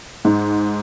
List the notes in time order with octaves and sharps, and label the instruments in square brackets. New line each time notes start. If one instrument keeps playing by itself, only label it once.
[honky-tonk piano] G#2